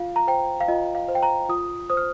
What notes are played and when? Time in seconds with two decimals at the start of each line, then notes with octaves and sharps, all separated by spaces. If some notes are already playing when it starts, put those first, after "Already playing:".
Already playing: F4 F5
0.16 A#5
0.27 C5 G5
0.61 F5
0.68 F4 D#5
0.95 F5
1.08 C5
1.15 G5
1.23 A#5
1.49 F4 D#6
1.90 C5 D#6
1.97 F6